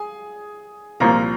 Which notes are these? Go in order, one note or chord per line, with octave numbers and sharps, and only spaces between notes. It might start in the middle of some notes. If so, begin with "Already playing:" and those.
Already playing: G#4 G#5
C2 A#2 F3 A#4 A#5